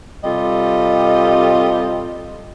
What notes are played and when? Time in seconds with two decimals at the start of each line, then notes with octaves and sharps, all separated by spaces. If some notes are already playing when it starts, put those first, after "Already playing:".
0.24 C3 G3 F4 A4 D#5